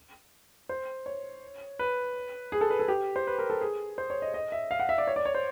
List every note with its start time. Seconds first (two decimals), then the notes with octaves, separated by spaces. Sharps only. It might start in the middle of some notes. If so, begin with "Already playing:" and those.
0.69 C5
1.06 C#5
1.79 B4
2.52 G#4
2.61 A4
2.70 B4
2.80 A4
2.88 G4
3.16 C5
3.27 B4
3.39 A#4
3.50 A4
3.61 G#4
3.98 C5
4.10 C#5
4.22 D#5
4.34 D#5
4.52 E5
4.71 F5
4.79 F#5
4.89 E5
4.98 D5
5.07 C#5
5.16 D5
5.25 C#5
5.34 C5